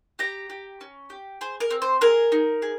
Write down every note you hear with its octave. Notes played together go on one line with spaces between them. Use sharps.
G4 A#5
G4
C#4
G4
G#4 C5
A#4
C4
C5
G#4 A#4
D#4
G#4